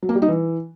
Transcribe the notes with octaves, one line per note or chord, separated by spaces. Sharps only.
F#3
A#3
G3
D#4
E3